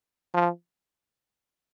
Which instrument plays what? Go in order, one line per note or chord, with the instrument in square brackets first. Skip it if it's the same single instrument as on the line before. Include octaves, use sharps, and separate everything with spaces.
[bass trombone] F3